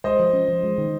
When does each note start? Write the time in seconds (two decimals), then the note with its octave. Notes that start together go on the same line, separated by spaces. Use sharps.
0.04 G#3 C5 D#5
0.19 F3
0.33 C#4
0.48 F3
0.63 G#3
0.78 D#3